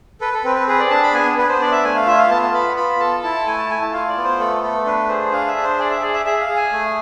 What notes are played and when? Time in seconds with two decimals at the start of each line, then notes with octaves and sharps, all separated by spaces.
0.21 A4 B4
0.33 A4
0.44 C4 B4
0.56 B4
0.68 G#4 B4
0.80 D5
0.90 D4 A5
1.03 B5
1.14 B3 G#5
1.37 B3 B4
1.49 C5
1.60 D4 D5
1.72 E5
1.84 A3 G#5
1.95 F5
2.07 F4 E5
2.18 F5
2.30 B3 A5
2.42 A5
2.53 B3 B5
2.76 F4 B5
3.00 A4 A5
3.23 E4 A5
3.47 A3 G#5
3.58 A5
3.70 A3 G#5
3.81 A5
3.93 F4 F5
4.09 D5
4.17 B3
4.24 C5
4.40 A3 A4
4.63 A3 A4
4.86 D4 B4
5.09 G#4 C5
5.32 D4 F5
5.48 E5
5.56 D4
5.63 C5
5.78 G#4 D5
5.91 E5
6.02 G#4 D5
6.14 E5
6.25 G#4 E5
6.41 F5
6.49 G#4
6.56 G#5
6.72 A3